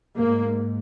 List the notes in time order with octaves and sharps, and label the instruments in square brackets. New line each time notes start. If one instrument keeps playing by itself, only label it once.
[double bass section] G#2 A#3